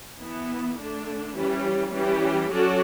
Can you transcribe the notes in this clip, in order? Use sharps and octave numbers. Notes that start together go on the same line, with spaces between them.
E3 B3 E4
D3 A3 D4
E3 G3 C#4
E3 G3 C#4 G4
F#3 C#4 F#4 A4 D5